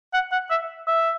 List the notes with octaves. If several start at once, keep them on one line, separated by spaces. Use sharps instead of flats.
F#5
F#5
E5
E5